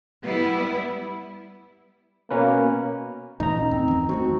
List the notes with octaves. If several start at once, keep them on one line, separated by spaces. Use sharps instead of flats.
G3 B3 E4
B2 A#3 C#4 B4
A#2 E3 A3 D#4 A#5
C#4
E2 C4
G2 D#3
A3 B3 C4 F#4